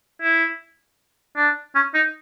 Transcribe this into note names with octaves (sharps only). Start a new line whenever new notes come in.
E4
D4
C#4
D#4